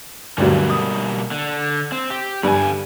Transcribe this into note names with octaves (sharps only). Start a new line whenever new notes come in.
D2 G2 B2 F#3 G3 A#3
D#6
D3
C4
G4
G2 D3 G#5